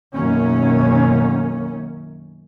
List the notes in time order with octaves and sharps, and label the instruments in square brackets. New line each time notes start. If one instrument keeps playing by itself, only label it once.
[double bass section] B1 F#2 B2 D#3 A#3 C#4